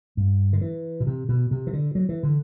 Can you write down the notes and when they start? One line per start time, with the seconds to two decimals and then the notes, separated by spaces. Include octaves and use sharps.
0.17 G2
0.53 D3
0.61 E3
1.00 B2
1.07 C3
1.29 B2
1.51 C3
1.67 E3
1.73 D3
1.95 F#3
2.09 E3
2.23 D3